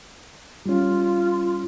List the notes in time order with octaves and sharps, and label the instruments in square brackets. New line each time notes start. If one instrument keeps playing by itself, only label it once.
[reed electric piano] G3 C#4 [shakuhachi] F4